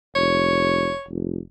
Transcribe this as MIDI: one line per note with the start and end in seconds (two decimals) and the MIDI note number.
0.15 0.91 29
0.15 1.06 73
1.08 1.39 29